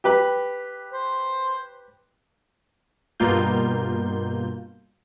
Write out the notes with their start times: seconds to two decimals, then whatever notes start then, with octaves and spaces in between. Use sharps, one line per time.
0.04 G4 B4
0.93 C5
3.20 G2 B2 A#3 F4 G6